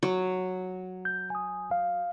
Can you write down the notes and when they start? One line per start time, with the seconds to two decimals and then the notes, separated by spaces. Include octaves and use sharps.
0.03 F#3
1.05 G6
1.30 G#5 D#6
1.71 F5